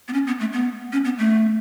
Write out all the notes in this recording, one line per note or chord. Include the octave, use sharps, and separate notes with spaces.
B3
C#4
B3
A3
B3
C#4
B3
A3